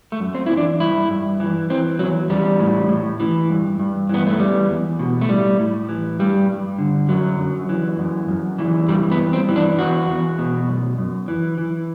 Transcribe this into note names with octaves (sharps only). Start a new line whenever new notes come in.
A3
F#2
C4
E3 E4
D4
G2 E4
G2
E3
E3 C4
E2 F#3
E2 G3
A2
A2
E3
G2
G2
E3 B3
A3
E2 G3
E2
B2
A3
A2 G3
A2
E3
G2 G3
G2
D3
F#2 F#3
F#2
E3
F#2
F#2
E3
G2 G3
B3
G2
C4
E3
D4
E2 F#4
E2
B2
F#2
F#2
E3
E3